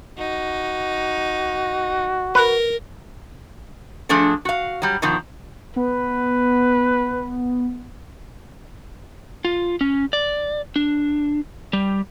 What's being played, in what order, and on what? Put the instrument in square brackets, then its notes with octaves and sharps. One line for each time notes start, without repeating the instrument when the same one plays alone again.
[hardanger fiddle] D#4 [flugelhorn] F#4
[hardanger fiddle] A#4 [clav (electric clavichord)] B4
[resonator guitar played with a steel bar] F3 A3 D4 G#4 A4
F#4 F5
F#3 G3
B2 D#3 F3
[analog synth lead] B3 [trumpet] B4
[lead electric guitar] F4
C#4
D5
D4
G3